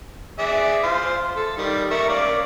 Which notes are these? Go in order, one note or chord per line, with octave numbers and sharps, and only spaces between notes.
G#4 D5 E5
C5 F5
A4
D#3 G3
A#4 E5 C#6
C#4 D5 F5